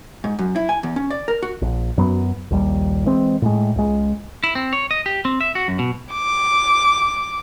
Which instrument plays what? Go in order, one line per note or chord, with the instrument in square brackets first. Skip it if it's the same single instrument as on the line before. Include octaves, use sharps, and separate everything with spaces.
[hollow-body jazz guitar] G#2
F#2
E4
G#5
E2
C#4
D5
A#4
F#4
[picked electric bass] A#1
F#2 F#3 B3
A#1 D#2 G3
E3 G#3 C4
A2 G#3
C#2 G#3
[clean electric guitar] E4
C4
C#5
D#5
G4
C4
E5
F#4
F#2
B2
[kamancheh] D6